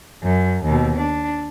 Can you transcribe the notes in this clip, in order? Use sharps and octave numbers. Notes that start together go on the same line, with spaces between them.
F#2
D#2 B2
D4